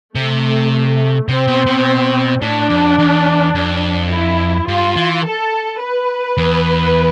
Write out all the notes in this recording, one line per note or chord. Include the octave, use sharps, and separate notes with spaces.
C3 A3
C3 C4
B2
B2
A2 D4
F2
E2
F2
E4
G2 F4
E3
A4
B4
E2